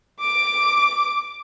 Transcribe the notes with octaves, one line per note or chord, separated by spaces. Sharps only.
D6 D7